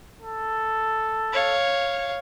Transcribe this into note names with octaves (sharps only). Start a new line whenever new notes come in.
A4
C#5 F5